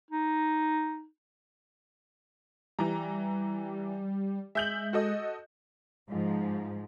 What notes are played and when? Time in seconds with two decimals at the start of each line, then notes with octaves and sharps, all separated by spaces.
0.11 D#4
2.79 E3 G3 A#5
4.55 G#3 E5 G6 F#7
4.93 F#4 A4 D#5
6.10 G#2 F3